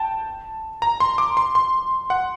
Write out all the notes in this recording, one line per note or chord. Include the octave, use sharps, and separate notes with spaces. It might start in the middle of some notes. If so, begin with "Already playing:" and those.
Already playing: G5 A5
A#5
C6
D6
C6
C6
F#5